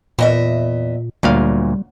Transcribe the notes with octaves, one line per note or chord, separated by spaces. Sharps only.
E2 A#2 D#5 E5
D2 A#2 F#3 G3 F5